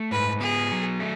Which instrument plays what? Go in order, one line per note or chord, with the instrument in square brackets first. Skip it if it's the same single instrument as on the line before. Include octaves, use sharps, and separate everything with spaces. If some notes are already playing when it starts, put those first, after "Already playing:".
Already playing: [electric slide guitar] A3
[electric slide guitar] G#2 [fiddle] B4
[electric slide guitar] B3 [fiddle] G#4
[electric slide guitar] F#3
A3